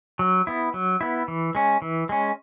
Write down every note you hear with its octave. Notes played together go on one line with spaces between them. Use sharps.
F#3
B3 E4
F#3
B3 E4
E3
G#3 C#4
E3
G#3 C#4